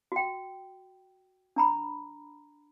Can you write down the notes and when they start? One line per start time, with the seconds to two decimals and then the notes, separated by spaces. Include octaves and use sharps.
0.12 F#4 G5
1.56 D4 A#5 B5